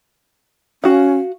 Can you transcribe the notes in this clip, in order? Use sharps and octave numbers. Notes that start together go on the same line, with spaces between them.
C#4 F#4 F5